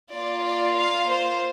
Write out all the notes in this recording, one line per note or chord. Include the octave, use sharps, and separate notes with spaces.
A#3 F4 D5
D5
F5
C5